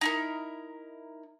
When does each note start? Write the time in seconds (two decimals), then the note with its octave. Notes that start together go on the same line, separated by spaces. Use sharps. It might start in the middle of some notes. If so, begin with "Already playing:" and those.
0.01 D#4 E4 A#4